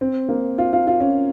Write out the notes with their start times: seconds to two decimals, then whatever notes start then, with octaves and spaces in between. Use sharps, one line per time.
0.01 C4
0.29 A#3
0.58 F4
0.73 F4
0.87 F4
1.00 C#4